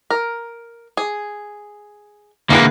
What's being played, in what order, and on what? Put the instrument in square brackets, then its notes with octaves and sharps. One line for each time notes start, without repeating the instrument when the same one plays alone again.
[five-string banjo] A#4
G#4
[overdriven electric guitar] D3 A#3 [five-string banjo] E3 G#4 B4